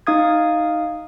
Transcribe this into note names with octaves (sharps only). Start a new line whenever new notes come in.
D#4 F5 D#6 G#6